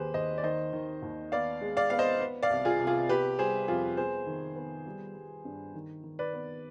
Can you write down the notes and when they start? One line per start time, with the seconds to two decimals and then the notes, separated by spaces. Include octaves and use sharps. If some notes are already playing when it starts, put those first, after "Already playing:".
Already playing: D#2 D#3 G4 G#4 B4 C5
0.14 D#2 C5 D#5
0.38 D5
0.44 D#3 C5 D#5
0.73 D#3
1.02 D#2
1.32 B3 D5 F5
1.61 G#3
1.77 D5 F5
1.90 B3 F5
1.99 C5 D#5
2.20 B3
2.43 D5 F5
2.50 C2
2.65 F4 G#4
2.79 C3
2.87 F4 G#4
3.08 B3 G4 B4
3.39 G3 G#4 C5
3.68 F2 F4 G#4
3.97 B3 G#4 C5
4.26 D#3
4.56 B3
4.86 G3
5.16 G3
5.45 G2
5.74 D#3
6.04 D#3
6.19 B4 D5
6.33 B3